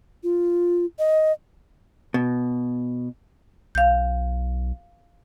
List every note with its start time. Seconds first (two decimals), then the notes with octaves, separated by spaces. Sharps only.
0.23 F4
0.99 D#5
2.14 B2
3.75 B1 F5 G6